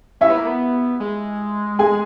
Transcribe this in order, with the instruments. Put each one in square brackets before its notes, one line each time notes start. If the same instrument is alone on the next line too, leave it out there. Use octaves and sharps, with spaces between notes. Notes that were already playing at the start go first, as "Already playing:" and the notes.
[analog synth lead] C#4 [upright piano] E4 E5
[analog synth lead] B3
A#3
B3
G#3
[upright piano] G#4 G#5